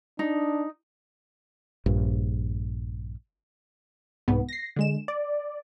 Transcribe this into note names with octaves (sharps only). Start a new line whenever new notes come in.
D4 D#4
A#1 G2
C2 G#2 B3
A#6 C7
D3 G#3 E7
D5